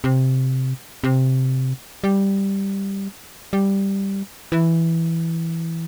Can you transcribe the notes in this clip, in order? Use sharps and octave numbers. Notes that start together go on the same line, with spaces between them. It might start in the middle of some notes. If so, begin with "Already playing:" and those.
C3
C3
G3
G3
E3